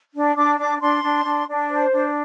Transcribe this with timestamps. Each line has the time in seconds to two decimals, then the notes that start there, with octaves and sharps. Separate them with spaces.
0.15 D4
0.36 D4 D6
0.59 D4 D6
0.81 D4 C6
1.04 D4
1.25 D4
1.47 D4
1.70 C5
1.93 D4